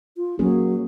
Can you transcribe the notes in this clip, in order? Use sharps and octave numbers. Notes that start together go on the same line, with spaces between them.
F4
F#3 A#3 C#4 G#4